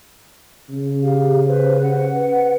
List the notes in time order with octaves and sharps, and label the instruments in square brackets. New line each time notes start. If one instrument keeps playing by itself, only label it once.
[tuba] C#3
[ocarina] G4 [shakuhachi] F5
[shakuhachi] B4 [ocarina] C5
[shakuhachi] F#5
[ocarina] B4